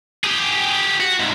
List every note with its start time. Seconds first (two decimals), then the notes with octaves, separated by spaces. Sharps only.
0.24 G4 G#4
1.00 F#4
1.20 C2 G#2